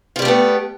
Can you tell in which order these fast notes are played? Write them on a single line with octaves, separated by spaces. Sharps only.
F4 G3 G4 A3 B3